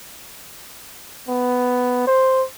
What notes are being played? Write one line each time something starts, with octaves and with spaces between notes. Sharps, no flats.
B3
C5